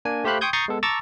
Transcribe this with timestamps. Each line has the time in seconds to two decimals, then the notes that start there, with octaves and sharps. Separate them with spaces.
0.05 A#3 D4 G#5
0.24 A3 G4 C5 F5 B5 F#6
0.41 G5 C6 C#6 D#6 G6 G#6
0.53 A#5 C#6 D#6 G6 A6 C7
0.68 G#3 B3 A4
0.83 A5 A#5 C#6 D6 E6 A6